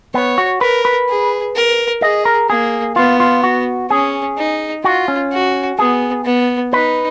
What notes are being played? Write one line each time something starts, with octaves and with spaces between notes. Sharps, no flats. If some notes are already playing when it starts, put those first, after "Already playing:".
B3 C#5
F#4
A#4 B4
B4
G#4
A#4
G#4 D#5
A#4
A#3 G#4
B3 F4
F4
F#4
C#4 G#4
D#4
F4 F#4
C#4
F#4
B3 G#4
B3
D#4 B4